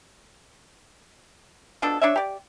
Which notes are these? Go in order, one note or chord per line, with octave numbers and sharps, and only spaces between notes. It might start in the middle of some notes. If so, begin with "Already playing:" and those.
B2 F3 D4 A4
D4 C#5 D5 E5
G4 D5